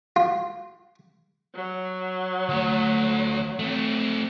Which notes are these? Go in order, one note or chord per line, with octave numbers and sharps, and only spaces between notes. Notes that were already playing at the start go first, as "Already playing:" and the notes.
F4
F#3
D2 A3
A3 C4